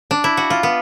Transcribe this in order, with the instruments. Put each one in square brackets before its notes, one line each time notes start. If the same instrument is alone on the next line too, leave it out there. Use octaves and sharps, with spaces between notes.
[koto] D4
E4
F#4
F4
B3